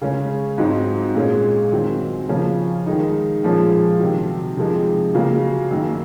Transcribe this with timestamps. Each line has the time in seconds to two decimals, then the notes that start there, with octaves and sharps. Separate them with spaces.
0.02 C#3 G#3 C#4
0.58 G#2 F#3 C4 D#4
1.15 A#2 G#3 C#4
1.72 F#2 D#3 F#3 C4
2.29 C#3 F3 A#3 C#4
2.86 D#3 G#3 D#4
3.43 A#2 F3 G#3 C#4
4.00 C3 D#3 F#3
4.57 C3 F3 G#3 D#4
5.15 C#3 F#3 A#3
5.71 F#2 D#3 A#3